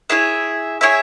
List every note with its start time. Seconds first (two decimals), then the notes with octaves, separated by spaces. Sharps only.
0.10 E4 G#4 C#5 E5
0.81 E4 G#4 C#5 E5